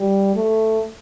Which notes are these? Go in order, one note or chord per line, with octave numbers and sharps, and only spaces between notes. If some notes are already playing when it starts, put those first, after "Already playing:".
Already playing: G3
A3